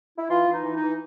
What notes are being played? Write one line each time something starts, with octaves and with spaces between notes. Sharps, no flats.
E4
E3 F4
E3
D#4
E3
D#4
E3